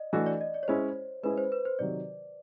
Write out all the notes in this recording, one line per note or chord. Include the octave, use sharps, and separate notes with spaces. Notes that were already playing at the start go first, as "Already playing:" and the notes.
Already playing: D5 D#5
E3 A3 D4 F#4 A4 D#5
D5
D#5
D5
C#5
G#3 C#4 E4 G#4 C5
G#3 C#4 E4 G#4 B4
C5
B4
C5
C3 D#3 F#3 D5